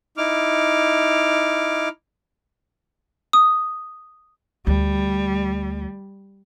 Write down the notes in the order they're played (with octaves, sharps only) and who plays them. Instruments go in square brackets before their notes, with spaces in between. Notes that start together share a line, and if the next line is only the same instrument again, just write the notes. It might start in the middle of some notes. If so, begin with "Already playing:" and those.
[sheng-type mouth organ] D#4 E4 D6 F6
[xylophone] D#6
[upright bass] D2 [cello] G3